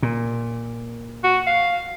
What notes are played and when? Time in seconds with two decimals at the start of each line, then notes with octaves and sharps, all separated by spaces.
0.03 A#2
1.24 F#4
1.47 F5